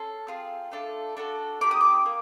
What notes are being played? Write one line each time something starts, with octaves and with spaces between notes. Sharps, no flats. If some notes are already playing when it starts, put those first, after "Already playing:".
Already playing: C#4 A4 C6
C4 F4 G#4
A3 D4 F4 A4
D4 F#4 A4
C4 D#4 G4 D6
D#6
D6
A#3